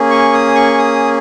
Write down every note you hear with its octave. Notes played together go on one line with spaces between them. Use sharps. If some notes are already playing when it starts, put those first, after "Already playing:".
Already playing: A#3 C#4 G#4
C#6
D#6
C#6
D#6